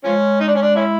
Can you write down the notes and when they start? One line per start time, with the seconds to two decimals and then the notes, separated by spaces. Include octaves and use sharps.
0.04 F3 G#3 C#4
0.40 D#4
0.48 D4
0.55 C#4
0.62 D4
0.76 C#4 E4